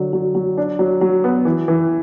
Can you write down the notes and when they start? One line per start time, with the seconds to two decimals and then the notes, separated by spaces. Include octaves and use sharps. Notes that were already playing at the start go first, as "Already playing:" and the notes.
Already playing: D3 F#3
0.13 F#3
0.35 F#3
0.57 D4
0.79 F#3
1.01 F#3
1.24 B3
1.45 E3
1.68 E3